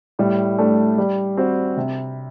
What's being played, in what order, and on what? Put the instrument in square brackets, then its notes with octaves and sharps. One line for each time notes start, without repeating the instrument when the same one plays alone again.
[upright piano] A2 [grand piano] G3
[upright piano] A3 D4
G3
C4 F#4 C5
C3